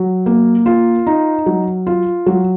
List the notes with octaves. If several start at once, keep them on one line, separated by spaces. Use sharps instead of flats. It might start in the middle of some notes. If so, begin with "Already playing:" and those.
Already playing: F#3
A#3
F4
D#4
F#3
F4
F#3